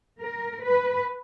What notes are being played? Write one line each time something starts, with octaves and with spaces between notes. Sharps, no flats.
A#4
B4